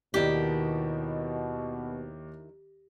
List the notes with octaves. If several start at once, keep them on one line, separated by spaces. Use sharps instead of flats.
D#2 B2 D#3 E4 G4 A#4 D5 D#5